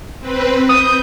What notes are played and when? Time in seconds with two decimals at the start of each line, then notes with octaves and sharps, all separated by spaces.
0.20 C4 B4
0.69 D#6 G6